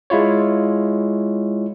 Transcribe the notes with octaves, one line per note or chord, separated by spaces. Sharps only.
G#3 E4 F4 C#5